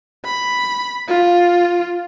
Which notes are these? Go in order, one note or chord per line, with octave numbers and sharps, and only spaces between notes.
B5
F4